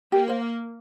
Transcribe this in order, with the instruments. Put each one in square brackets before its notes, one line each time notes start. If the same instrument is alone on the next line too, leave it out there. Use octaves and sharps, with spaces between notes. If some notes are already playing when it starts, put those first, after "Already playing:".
[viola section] A#3 [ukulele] G4
[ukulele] C5 F5